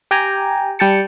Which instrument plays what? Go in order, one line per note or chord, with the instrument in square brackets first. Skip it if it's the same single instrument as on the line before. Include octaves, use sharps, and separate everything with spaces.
[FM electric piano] G4 G5 G#5 A#5
G3 G5 A5 C#7